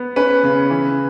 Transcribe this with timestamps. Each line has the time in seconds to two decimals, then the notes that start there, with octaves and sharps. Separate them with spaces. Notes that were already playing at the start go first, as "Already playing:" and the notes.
Already playing: B3
0.16 C#4 B4
0.43 C#3
0.70 E3